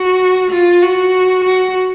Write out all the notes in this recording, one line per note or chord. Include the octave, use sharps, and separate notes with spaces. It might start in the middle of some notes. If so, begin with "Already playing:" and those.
Already playing: F#4
F4
F#4
F#4